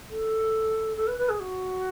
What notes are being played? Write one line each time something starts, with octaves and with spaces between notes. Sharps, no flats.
A4
A4
B4
B4
G#4
F#4